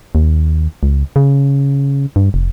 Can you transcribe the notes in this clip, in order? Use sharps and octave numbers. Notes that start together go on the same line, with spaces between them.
D#2
C#2
C#3
G2
F1